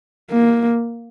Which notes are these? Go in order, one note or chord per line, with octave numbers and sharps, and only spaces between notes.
A#3